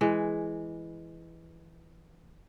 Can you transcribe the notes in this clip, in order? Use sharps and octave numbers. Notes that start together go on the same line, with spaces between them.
E3 G#3